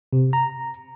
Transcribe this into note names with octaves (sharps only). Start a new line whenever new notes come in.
C3
A#5